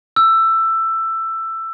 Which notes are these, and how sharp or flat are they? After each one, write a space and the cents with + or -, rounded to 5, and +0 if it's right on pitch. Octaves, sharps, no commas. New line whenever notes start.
E6 +15